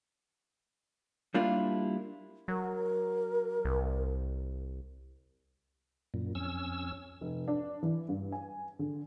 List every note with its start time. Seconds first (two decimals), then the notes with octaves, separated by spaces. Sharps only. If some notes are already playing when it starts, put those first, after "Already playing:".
1.34 G3 A#3 D4 E4 F4
2.48 F#3 A#4
3.65 C2
6.14 F#2 A#2
6.35 F2 C#4 E6
7.21 F1
7.48 D4
7.83 E3
8.09 G2
8.32 G#5
8.79 D3